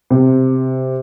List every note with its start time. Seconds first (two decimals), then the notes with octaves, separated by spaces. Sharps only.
0.10 C3